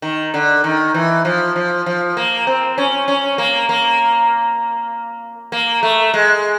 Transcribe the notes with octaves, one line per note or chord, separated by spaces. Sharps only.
D#3
D3
D#3
E3
F3
F3
F3
A#3
C4
C#4
C#4
A#3
A#3
A#3
A3
G#3